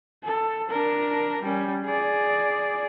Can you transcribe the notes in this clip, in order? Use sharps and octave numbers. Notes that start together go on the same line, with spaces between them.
A4
D4 A#4
G3 C#4
G#4 D5